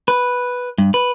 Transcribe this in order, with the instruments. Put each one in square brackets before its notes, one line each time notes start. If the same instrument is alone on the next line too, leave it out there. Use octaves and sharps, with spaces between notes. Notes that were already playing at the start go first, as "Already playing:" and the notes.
[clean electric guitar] B4
G2
B4